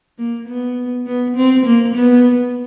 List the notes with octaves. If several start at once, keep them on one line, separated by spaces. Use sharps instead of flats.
A#3
B3
B3
C4
A#3
B3